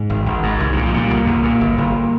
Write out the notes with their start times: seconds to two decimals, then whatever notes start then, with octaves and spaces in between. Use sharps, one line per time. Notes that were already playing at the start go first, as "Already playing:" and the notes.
Already playing: G#2
0.10 G#1
0.26 G#1
0.43 G#2
0.60 C2 G#3
0.73 A#2 D#3
0.86 F3
0.94 A#2 G3
1.10 C2 A#3
1.26 C2
1.43 A#2
1.61 G1
1.78 G1